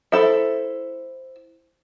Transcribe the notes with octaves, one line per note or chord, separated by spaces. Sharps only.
E4 A4 C5 E5